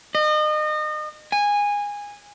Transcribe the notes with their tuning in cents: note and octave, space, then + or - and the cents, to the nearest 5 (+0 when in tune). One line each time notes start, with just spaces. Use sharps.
D#5 -35
G#5 -15